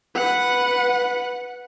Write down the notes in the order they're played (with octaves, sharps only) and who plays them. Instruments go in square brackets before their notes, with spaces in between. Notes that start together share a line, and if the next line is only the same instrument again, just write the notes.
[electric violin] B4 F#5